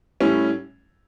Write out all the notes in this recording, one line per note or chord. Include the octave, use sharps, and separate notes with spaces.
A2 G3 C#4 E4